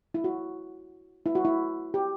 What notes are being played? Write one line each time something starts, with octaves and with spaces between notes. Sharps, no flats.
E4
F#4
E4
F#4
E4
G4